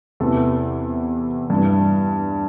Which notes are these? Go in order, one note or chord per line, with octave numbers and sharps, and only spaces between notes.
E2 C3 E3 A4
G2 E3